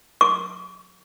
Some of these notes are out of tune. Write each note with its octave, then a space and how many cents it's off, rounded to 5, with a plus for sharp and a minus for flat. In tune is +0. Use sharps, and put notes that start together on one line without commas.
C#6 +45